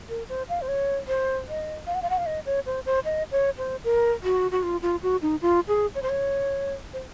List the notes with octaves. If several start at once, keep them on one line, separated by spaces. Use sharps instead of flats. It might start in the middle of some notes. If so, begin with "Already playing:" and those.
A#4
C5
F5
C5
C#5
C5
D#5
F5
F#5
F5
F#5
F5
D#5
C#5
C5
C5
D#5
C#5
C5
A#4
F#4
F#4
F4
F4
F#4
D#4
F4
G#4
C#5
C5
C#5
C5